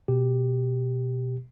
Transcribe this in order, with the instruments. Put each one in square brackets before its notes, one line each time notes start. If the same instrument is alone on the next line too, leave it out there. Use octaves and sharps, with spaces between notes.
[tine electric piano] B2 G4